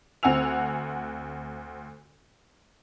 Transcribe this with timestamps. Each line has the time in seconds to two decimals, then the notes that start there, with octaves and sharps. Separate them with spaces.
0.23 D2 C4 F#5 G#5 E6 F7